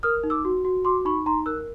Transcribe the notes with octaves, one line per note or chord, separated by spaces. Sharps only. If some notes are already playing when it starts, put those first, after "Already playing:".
A#4 D#6 F6
D#4
D6 E6
F#4
F#4
F#4 C6 D6
D#4 B5 C#6
D#4 A#5 C6
A#4 E6 F#6